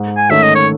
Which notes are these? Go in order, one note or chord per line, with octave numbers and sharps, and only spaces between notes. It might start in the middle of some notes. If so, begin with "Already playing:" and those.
Already playing: G#2
G#5
D#3 A3 C#4 E5
D#5
C#5